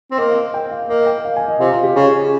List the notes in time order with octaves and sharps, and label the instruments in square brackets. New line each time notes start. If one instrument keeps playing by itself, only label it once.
[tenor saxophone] C4
[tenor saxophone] A#3 [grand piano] D#5
[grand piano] F5
G5
F5
[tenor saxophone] A#3 [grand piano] D#5
[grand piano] G5
F5
G#5
D#5
[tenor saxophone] C3 [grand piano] F4
[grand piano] F4
G4
[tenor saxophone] C#3 [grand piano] G#4